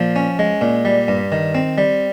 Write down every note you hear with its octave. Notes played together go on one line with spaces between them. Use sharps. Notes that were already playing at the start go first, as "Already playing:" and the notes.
Already playing: A#2 F3
C#4
G#3
A#2
G3
G2
D#3
C4
G3